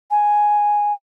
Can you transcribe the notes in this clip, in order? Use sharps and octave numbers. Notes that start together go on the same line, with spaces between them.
G#5